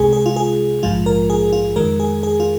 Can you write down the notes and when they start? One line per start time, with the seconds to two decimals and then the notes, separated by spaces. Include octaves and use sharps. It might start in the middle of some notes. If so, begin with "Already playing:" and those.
Already playing: C2 C3 G#3 G#4
0.13 G#4
0.26 F4
0.36 G#4
0.83 A#1 G#2 F3 G#3 F4
1.06 A#4
1.30 G#4
1.52 F4
1.76 F2 D#3 G#3 A#4
2.00 G#4
2.23 G#4
2.40 F4